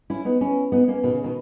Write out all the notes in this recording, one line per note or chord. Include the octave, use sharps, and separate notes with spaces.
C#4 E4
B3 D#4
C#4 E4
B3 D#4
A#3 C#4
B2 D#3
C#3
B2 D#3